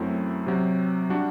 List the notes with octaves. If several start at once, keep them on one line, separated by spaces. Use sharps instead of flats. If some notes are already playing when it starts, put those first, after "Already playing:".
Already playing: F#2 F#3 A3 C4 E4
C3 F#3 C4
G3 D4 F#4